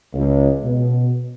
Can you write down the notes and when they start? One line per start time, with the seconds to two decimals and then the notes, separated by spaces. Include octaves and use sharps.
0.14 C#2
0.64 B2